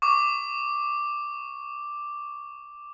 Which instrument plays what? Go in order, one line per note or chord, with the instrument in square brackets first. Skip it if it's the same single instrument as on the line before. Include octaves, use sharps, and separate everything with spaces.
[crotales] C#6 D6